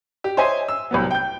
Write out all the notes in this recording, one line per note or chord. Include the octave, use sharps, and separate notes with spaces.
G4
C5 C#5 D#5 E5 G#5 C6
E6
C2 F#3 B3
G5 G6